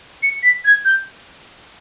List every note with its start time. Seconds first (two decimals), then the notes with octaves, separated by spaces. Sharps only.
0.23 C#7
0.43 B6
0.65 G#6
0.85 G6